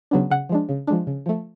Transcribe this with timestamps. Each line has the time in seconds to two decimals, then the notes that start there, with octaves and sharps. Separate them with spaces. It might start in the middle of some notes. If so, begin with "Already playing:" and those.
0.11 C#3 F#3 B3 D4
0.31 C#3 F#5
0.49 F3 G#3 D4
0.69 C#3
0.87 F3 G#3 D4
1.07 C#3
1.26 F3 A3